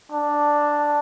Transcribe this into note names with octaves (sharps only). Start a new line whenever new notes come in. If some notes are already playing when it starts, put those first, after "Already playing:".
D4